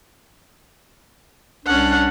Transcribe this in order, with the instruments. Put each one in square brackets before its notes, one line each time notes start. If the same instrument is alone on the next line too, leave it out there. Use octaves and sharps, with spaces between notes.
[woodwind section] C2 D4 [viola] C#4 F#5